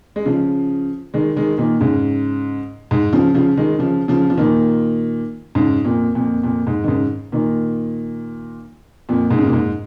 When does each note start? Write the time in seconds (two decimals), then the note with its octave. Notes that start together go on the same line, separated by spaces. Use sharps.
0.16 G#3
0.26 C#3 F3
1.14 D#3 G#3
1.36 D#3 G#3
1.58 A#2 D#3
1.81 G#2 C#3
2.91 G#2
3.13 C#3 F3
3.35 C#3 F3
3.57 D#3 G#3
3.79 C#3 F3
4.08 C#3 F3
4.30 F3
4.37 A#2 D#3
5.55 G#2 C#3
5.85 F2 A#2
6.15 F2 A#2
6.44 F2 A#2
6.67 G#2
6.84 D#3
6.88 G#2 C#3
7.32 A#2 D#3
9.09 F2 A#2
9.31 G#2
9.38 C#3
9.46 A#2
9.53 G#2